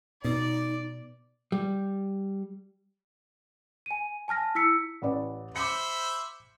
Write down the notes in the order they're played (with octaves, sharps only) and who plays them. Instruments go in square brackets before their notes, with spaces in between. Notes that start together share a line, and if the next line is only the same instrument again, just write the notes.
[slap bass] B2 [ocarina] D#4 [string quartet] D5
[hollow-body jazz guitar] G3
[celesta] G#5 D#7
G#5 A5 F6 A#6
E4 E6 B6 C#7
[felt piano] A1 B4 D5
[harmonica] C5 E5 B5 [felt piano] D6 C#7